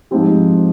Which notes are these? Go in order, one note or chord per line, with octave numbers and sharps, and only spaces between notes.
G#2 F3 C4 G4